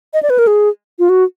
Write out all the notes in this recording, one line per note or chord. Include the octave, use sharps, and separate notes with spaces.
D#5
D5
B4
A#4
G#4
F4
F#4